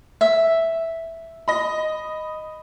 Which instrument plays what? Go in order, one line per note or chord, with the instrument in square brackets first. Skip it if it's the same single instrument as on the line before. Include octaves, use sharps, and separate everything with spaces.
[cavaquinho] E5
[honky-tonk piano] D#5 B5